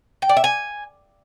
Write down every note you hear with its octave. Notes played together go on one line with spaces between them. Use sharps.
G5
D5
E5
G#5